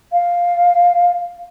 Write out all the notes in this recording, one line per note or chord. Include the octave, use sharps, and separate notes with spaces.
F5